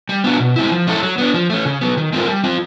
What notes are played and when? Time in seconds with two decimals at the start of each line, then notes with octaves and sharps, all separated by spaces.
0.09 G3
0.24 B3 D4 F#4
0.40 B2
0.56 G#3 C4 E4
0.71 F3
0.87 G#3 C#4 E4 A4
1.02 F#3
1.18 B3 D4
1.34 F3
1.50 A3 C#4
1.65 C#3
1.81 F#3 B3
1.97 D#3
2.13 G#3 C4 F4 A#4
2.28 G3
2.44 C4 F4